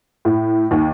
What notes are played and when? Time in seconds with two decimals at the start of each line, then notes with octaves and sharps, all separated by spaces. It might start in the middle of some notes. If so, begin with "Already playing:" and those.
0.25 A2
0.71 D#2